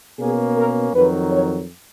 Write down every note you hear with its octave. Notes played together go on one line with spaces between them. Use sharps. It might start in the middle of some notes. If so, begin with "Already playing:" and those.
B2 A#3 C#4 G#4
A#4
F2 D#3 F#3 B4
C#5